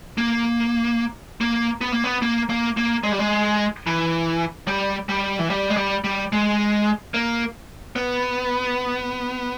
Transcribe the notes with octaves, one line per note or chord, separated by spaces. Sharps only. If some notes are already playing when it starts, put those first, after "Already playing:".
A#3
A#3
B3
A#3
B3
A#3
A#3
A#3
G#3
G3
G#3
E3
G3
G3
E3
G3
G#3
G3
G3
G#3
A#3
B3